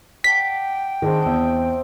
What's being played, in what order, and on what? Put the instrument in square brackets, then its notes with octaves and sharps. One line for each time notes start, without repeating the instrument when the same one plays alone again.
[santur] D5 F#5 A5 [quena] G5 [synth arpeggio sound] B6
[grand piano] D#3 G#4 [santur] C4 D4 D#5
[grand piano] E2 [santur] E5 D#6